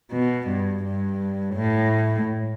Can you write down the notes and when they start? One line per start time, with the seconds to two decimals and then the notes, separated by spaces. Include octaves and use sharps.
0.12 B2
0.49 G2
0.84 G2
1.55 A2